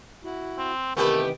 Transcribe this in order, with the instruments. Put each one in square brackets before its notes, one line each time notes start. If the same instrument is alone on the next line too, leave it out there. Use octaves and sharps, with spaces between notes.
[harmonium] E4 F#4
[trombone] C4
[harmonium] C3 D#3 E3 [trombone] A3 [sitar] B3 G4 B4 [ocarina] A#4